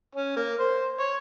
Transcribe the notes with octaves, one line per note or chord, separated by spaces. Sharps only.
C#4
A#3
C5
C#5